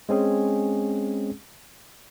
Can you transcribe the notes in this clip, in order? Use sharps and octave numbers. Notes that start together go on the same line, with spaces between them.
G#3 C4 C#4 G#4